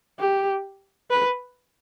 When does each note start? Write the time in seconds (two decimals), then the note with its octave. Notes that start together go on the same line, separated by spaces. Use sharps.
0.19 G4
1.10 B4